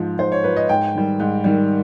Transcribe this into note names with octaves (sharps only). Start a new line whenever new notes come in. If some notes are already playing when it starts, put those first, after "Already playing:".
Already playing: G#2 F3
G#2 C5
C#5
F3 B4
D#5
G#2 G5
D#3 G3
G#2
D#3 G3